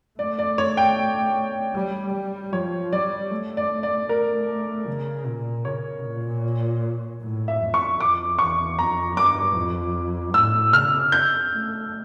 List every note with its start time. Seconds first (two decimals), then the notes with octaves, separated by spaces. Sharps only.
0.19 A3 D5
0.39 D5
0.58 C#5
0.77 G5
1.75 G3
2.13 G3
2.53 F3 C#5
2.92 G3 D5
3.31 A3
3.57 D5
3.83 D5
4.09 A3 A#4
4.87 C#3
5.26 A#2
5.65 C#3 C#5
6.05 A#2
7.22 A2
7.48 E5
7.61 F2
7.74 C#6
8.00 F2 D6
8.38 E2 C#6
8.78 F2 A#5
9.16 G2 D6
9.56 F2
10.34 A2 E6
10.73 C#3 F6
11.12 G6
11.52 A3